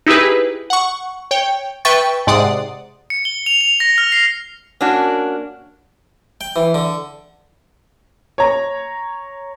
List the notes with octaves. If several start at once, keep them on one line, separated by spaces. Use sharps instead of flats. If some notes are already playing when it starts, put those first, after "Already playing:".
D#4 E4 G4 G#4 B4
F#5 C#6
C#5 G5
B4 E5 G5 C#6 A6
G#2 C3 D5 F#5 C6 D#6
C#7
G7
F7
F7
A#6
F6
C7
A#3 C#4 D4 F#4
G5
E3
D3
C#5 A#5